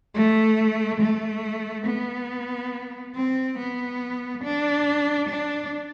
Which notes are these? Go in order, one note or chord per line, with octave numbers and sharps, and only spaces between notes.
A3
A3
B3
C4
B3
D4
D4